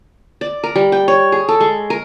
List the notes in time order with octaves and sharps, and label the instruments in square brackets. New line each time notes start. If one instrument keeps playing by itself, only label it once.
[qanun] D5
A#4
G3
G5
C#5
G#4
A4
G#3
A#4